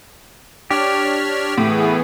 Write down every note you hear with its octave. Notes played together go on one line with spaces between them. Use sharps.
D4 G4 C#5 F6
A2 E3 B3 G#4